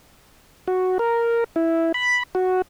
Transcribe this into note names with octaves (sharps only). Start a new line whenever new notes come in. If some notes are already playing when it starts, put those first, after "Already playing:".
F#4
A#4
E4
B5
F#4